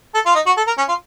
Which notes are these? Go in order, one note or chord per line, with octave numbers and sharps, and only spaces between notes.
A4
F4
D#4
F#4
A4
A#4
C#4
F4